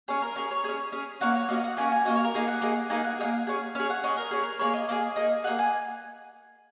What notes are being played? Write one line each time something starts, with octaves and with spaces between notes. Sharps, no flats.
C#4 G#4 C#5
A#4
C#4 G#4 A#4
C#5
C#4 G#4 C#5
C#4 G#4
A#3 C#4 F#4 F#5
C#5
A#3 C#4 F#4 D#5
F#5
A#3 C#4 F#4 G#5
G#5
A#3 C#4 F#4 D#5
C#5
A#4
A#3 D#4 G#4
F#5
A#3 D#4 G#4
A#3 D#4 G#4 G#5
F#5
A#3 D#4 G#4
C#4 G#4
C#4 G#4 C#5
F#5
C#4 G#4 D#5
A#4
C#4 G#4
A#4
A#3 D#4 G#4 C#5
D#5
A#3 D#4 G#4
A#3 D#4 G#4
A#3 D#4 G#4 F#5
G#5